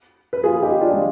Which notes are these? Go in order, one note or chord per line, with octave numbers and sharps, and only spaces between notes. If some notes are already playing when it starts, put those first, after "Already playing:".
B4
F4 G#4
D#4 G4
D4 F4
G#3